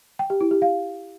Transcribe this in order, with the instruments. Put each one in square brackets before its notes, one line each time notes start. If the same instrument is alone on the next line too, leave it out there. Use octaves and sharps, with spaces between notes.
[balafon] G5
G4
E4
G4
F5